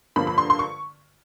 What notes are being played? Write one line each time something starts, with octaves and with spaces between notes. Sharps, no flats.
G2 D3 F3 A#3 B5
B5
C6
C6
C#6